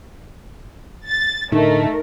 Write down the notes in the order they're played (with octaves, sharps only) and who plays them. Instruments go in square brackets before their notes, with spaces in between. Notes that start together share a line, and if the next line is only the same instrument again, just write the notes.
[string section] A6
[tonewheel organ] A2 D3 [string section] A3 [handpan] D#4 [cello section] A#4